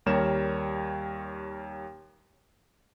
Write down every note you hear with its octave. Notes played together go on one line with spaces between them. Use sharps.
D#2 G3 A#4 C#5 E7